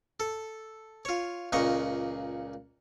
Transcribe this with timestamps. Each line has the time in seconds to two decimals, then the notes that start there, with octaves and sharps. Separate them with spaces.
0.20 A4
1.05 F4 C#5
1.52 C#2 A#2 D#5 C#6